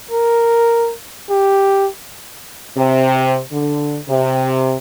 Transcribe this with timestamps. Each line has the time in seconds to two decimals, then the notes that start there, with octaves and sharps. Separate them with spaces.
0.11 A#4
1.30 G4
2.76 C3
3.52 D3
4.08 C3